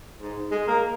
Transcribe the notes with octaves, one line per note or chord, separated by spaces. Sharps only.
G#2
G#3
A#3